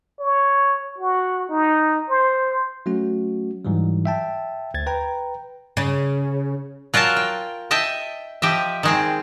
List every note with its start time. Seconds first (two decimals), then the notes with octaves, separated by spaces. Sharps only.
0.19 C#5
0.98 F#4
1.50 D#4
2.10 C5
2.86 F#3 A3 C#4 F#4
3.65 G#2 E3 F#3 G3
4.06 E5 G5 A5
4.74 D2 G#6 A6
4.86 B4 G5 A#5
5.77 C#3
6.94 F#3 F4 A#4 G#5 A5
7.16 G5
7.71 D#5 E5 G5 A5
8.42 F3 G4 D#5 E5
8.83 D#3 G#3 C4